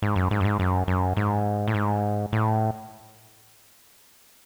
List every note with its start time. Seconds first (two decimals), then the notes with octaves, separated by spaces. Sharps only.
0.02 G#2
0.16 F#2
0.31 G#2
0.40 F#2
0.45 G#2
0.60 F#2
0.88 F#2
1.17 G#2
1.68 A2
1.74 G#2
2.33 A2